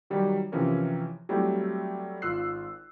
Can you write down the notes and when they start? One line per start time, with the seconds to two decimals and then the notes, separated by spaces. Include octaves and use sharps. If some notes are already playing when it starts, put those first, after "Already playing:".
0.10 D#3 F#3 G3 G4
0.52 C3 E3 F3 C#4 A#4
1.29 F#3 G3 A3 C4 E4 G4
2.22 G#1 F4 E6 F#6 C7